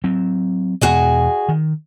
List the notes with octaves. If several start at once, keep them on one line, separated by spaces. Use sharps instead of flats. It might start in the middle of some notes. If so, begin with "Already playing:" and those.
F#3 C4
E2 B2 F#4 G#4 D#5
D#3